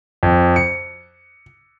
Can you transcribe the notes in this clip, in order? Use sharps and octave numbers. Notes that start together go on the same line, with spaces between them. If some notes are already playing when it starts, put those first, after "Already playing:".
F2
C#7